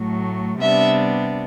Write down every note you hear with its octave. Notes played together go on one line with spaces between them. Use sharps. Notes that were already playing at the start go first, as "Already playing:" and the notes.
Already playing: A2 F#3 A3
C3 G3 B3 D4 E5